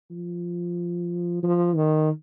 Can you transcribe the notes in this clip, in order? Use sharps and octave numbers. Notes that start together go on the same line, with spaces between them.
F3
F3
D#3